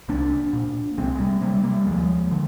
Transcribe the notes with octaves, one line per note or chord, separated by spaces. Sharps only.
C2 A#3 D4
A#2
C2 G#3 C4
G#3
G3 A#3
C3 G3 A#3
G3 A#3
D#2 F3 G#3
D3